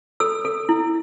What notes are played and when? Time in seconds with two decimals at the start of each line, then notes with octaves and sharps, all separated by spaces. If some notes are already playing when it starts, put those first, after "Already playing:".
0.20 A4 E6
0.45 A4
0.69 E4